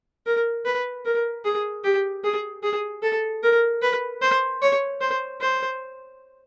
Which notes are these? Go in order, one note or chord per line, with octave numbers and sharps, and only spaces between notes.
A#4
B4
A#4
G#4
G4
G#4
G#4
A4
A#4
B4
C5
C#5
C5
C5